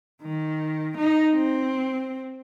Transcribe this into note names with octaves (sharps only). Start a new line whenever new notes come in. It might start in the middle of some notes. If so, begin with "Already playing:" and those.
D#3
D#4
C4